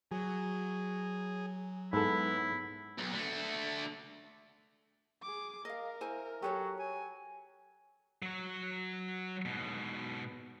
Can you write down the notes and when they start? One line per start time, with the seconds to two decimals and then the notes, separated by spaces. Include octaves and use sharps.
0.11 F#3 G#4
1.93 G#2 B3 E4 A4
2.98 B1
3.12 D3 A3
5.23 G#4 D6
5.65 A#4 D#5 F5
6.01 E4 C5 G#5
6.42 F#3 G4 A4 C#5
6.79 G#5
8.22 F#3 C#5
9.45 G#2 B2